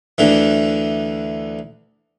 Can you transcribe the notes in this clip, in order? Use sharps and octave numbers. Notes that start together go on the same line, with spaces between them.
D2 D3 E3